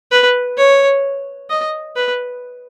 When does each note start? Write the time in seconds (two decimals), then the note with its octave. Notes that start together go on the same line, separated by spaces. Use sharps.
0.12 B4
0.57 C#5
1.50 D#5
1.96 B4